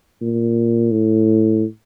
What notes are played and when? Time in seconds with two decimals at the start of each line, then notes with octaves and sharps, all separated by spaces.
0.22 A#2
0.91 A2